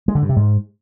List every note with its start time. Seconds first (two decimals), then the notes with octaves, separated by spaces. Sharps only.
0.08 G#3
0.15 D3
0.22 G2
0.29 C3
0.36 G#2